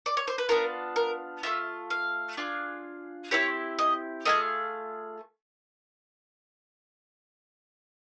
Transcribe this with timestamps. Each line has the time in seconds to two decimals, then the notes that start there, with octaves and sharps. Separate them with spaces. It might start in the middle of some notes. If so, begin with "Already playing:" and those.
0.06 D5
0.17 C#5
0.27 C5
0.38 B4
0.49 B3 D4 F4 A#4
0.96 A#4
1.43 A3 D4 F4 E5
1.90 F5
2.37 D4 F4 G#4
3.31 C4 E4 G4 C#5
3.79 D#5
4.25 A3 D4 F4 G#4 D#5